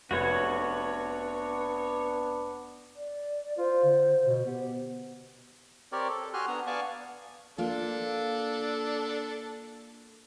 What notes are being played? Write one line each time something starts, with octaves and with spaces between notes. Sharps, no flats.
F1 B3 D4 F#4 B4 C#5 G#6
D5
F4 C5
D3
B2
B3 G4
C4 G4 A#4 C#5 D5
A4
F#4 G4 G#5 C6 F6 F#6
B3 D4 A#5
B3 D5 F5 G#5 A5 C#6
A#3 D4 F4 A4